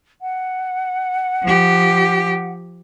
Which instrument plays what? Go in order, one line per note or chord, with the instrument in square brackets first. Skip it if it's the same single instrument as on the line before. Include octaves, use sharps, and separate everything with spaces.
[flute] F#5
[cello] F3 G4